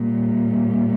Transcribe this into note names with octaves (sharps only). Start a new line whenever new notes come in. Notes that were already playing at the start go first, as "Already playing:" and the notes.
Already playing: A#2 G3